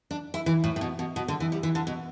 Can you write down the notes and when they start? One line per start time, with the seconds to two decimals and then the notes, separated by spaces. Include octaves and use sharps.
0.11 D4
0.34 E4
0.46 E3
0.64 A2
0.76 A2
0.81 B2
0.99 B2
1.16 B2
1.28 D3
1.40 E3
1.52 G3
1.63 E3
1.75 D3
1.87 B2